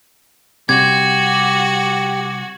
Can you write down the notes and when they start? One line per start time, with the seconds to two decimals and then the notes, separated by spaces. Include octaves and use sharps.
0.69 C3 G3 F#4 G4 G#6